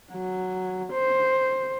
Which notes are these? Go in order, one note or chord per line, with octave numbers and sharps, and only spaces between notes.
F#3
C5